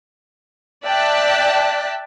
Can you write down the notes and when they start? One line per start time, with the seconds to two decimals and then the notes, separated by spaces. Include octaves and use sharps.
0.85 D5 E5 G5 A5 F#6 B6